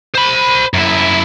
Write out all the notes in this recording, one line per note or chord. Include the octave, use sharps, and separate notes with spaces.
C5 B5
F#2 E4